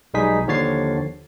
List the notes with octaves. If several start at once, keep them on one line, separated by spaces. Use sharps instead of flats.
B1 G3 G#3 D#4 G#4 B6
D#2 D3 F3 C#5 A6 C7